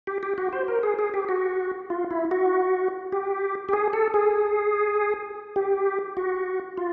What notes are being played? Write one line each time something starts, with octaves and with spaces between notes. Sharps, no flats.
G4
G4
F#4
C5
A#4
G#4
G#4
G4
F#4
F4
E4
F#4
G4
G4
G#4
A4
G#4
G4
F#4
F4